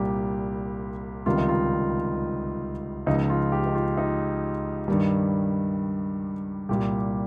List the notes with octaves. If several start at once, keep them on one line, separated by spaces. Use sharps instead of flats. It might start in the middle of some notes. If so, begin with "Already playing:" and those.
Already playing: C2 A#2 G3 G4
C#2 C3 D#3 G3 F4
D#4
F4
C#2 C#3 F3 D#4
F4
G4
D#4
F4
D#4
G2 D#3 G3
C2 A#2 G3 G4